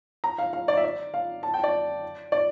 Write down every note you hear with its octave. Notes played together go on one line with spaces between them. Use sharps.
A#5
F5
F5
D5
E5
D5
F5
A5
G5
D5
D5